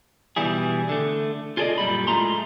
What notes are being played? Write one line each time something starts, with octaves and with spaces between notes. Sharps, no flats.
B2 E3 G3 E4 G#4
D3 A3
F4 G#4 A4 C5 D5 D#5
F#2 A#2 G3 B5
A2 G#3 A3 F4 A#5 C6